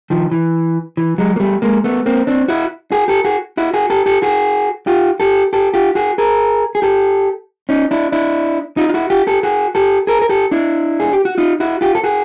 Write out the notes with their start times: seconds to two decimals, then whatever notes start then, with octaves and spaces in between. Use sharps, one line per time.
0.10 D#3 F3
0.32 E3
0.97 E3
1.18 F#3 G#3
1.36 A#3
1.40 G3 A3
1.62 G#3 A#3
1.84 A3 B3
2.06 A#3 C4
2.27 C4 D4
2.48 E4 F#4
2.92 F#4 G#4
3.08 G4 A4
3.25 F#4 G#4
3.57 E4 F#4
3.74 F#4 G#4
3.90 G4 A4
4.06 G4 A4
4.22 F#4 G#4
4.87 F4 G4
5.20 G4 A4
5.53 G4 A4
5.74 F4 G4
5.95 F#4 G#4
6.18 G#4 A#4
6.75 G#4
6.82 G4 A4
7.69 C#4 D#4
7.91 D4 E4
8.12 D4 E4
8.77 D#4 F4
8.89 F4
8.94 E4 F#4
9.10 F4 G4
9.27 G4 A4
9.43 F#4 G#4
9.75 G4 A4
10.07 G#4 A#4
10.22 A#4
10.29 G4 A4
10.51 D4 E4
11.00 G#4
11.13 G4
11.25 F#4
11.38 D#4 F4
11.60 E4 F#4
11.81 F4 G4
11.95 A4
12.04 F#4 G#4